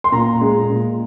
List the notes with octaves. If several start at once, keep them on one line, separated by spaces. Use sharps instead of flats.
C6
A#2 A#5
G#3
A#2